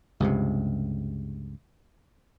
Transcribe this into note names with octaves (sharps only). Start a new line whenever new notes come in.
C#2 G2 C3